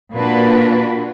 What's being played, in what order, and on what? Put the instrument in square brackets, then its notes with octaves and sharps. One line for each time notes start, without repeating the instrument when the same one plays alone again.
[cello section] A#2 A#3 D4 F#4 B4